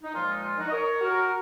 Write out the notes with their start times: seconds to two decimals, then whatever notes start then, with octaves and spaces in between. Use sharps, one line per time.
0.02 D#4
0.14 A#2 F3 G#3 F4
0.29 D#4
0.43 F4
0.58 D#4 F#4
0.68 D#5
0.72 A#4 C#5
1.01 F#4 A#4